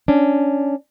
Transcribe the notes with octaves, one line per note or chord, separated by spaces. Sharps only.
C#4 D4